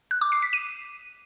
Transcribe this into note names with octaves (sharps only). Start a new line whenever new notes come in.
F#6
D6
C7
B6
D#7